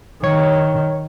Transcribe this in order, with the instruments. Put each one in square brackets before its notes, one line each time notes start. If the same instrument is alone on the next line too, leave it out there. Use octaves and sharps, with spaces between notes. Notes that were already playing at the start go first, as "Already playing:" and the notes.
[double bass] D#3 [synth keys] C#5